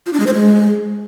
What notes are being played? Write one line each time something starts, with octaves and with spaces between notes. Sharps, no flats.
F4
D4
G#3
C5
G#3